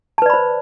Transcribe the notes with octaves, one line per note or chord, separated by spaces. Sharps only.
B4 C5 D5 A5 B5